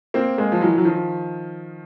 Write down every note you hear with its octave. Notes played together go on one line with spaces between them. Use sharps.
A#3 C4
G#3 A#3
F3
E3 F#3
F#3
D#3 F3